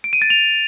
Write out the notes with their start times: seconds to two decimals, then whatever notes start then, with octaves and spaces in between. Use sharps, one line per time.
0.04 D7
0.13 D#7
0.22 A6
0.30 F7